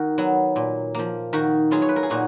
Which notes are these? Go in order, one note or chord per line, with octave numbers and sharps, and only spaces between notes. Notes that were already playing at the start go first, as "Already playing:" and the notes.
Already playing: D#3 F#4 A#4
F#3 B3
A#2
F3 A#3
D#3 F#4 A#4
F#3 B3 F4 G#4
C#5
B4
A#4
G#4
A#2 D#4 F#4